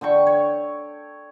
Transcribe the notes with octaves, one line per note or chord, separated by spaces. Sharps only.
D3 A4 G5 C#6
C#5